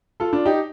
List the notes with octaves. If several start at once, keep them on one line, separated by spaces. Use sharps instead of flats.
F4 A4
D4 F4
D#4 G4